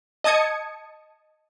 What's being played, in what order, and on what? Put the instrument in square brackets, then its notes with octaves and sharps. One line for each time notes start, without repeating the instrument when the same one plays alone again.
[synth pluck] D#5 A5 D#6 G#6 C#7